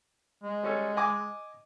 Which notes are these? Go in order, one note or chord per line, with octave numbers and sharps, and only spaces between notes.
G#3
G3 C#4 A4
D#5 G#5 D6